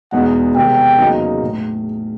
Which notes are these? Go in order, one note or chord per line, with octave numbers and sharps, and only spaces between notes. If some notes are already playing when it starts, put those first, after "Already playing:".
E2 B2 G#3 B3 D#4 F#5
E2 C3 D#3 G#3 C4 G5
E2 C#3 F#3 A#3 D#4
A2